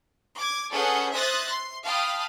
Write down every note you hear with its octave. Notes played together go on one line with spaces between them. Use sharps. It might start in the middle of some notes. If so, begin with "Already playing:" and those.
D6 G#6
C#4 G#4 A4 B4 F#5 G6
C5 E5 D#6 F#6 A6 A#6
C6
F5 G5 A5 B5 D#6